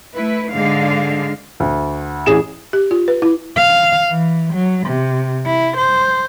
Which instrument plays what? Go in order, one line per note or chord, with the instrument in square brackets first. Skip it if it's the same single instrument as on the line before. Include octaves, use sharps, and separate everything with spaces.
[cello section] A3 E4 B4
G#2 D3 G#3 F5
[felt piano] D2
A1 G#4 E7
[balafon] G4
F4
B4
E4
[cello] F5
E3
F#3
C3
E4
C5